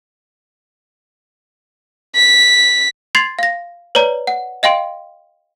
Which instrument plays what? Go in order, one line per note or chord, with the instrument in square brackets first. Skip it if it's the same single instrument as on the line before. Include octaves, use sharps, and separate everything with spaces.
[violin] B6
[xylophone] C6 G#6 A6 C7 F7
F5 A#6
B4 C#5 D5 A#5
F#5
D#5 F5 G5 C6 D7